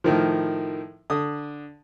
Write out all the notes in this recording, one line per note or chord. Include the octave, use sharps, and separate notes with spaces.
A2 D#3 F3
D3 D#6